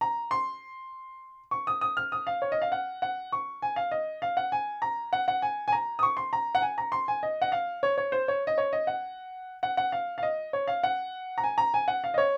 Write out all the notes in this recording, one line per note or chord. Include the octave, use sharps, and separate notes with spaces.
A#5
C6
C#6
D#6
D#6
F6
D#6
F5
C#5
D#5
F5
F#5
F#5
C#6
G#5
F5
D#5
F5
F#5
G#5
A#5
F#5
F#5
G#5
G#5
A#5
D#6
C#6
C6
A#5
F#5
G#5
A#5
C6
G#5
D#5
F#5
F5
C#5
C#5
C5
C#5
D#5
C#5
D#5
F#5
F#5
F#5
F5
F5
D#5
C#5
F5
F#5
A#5
G#5
A#5
G#5
F#5
F5
D#5
C#5